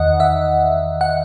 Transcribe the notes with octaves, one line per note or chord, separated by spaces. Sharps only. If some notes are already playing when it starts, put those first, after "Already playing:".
Already playing: E2 D#3 D#5 F#5
E5
F#5